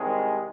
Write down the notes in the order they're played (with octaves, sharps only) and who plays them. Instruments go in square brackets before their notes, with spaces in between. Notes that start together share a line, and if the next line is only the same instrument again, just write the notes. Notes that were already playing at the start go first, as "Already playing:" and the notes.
Already playing: [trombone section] C2 C3 D#3 G#3